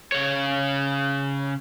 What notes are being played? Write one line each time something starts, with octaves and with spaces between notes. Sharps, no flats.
C#3 C#5